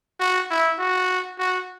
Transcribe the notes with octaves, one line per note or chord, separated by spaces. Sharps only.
F#4
E4
F#4
F#4